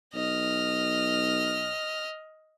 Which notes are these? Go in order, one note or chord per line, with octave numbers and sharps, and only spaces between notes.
B1 D#5 F6